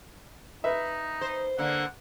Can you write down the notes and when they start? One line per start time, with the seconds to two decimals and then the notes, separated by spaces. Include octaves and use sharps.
0.64 D#4 B4 E5
1.21 C5
1.58 D3 A#3 F#5